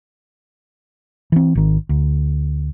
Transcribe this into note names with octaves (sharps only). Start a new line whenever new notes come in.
E3 C4
G#1 D#3
D2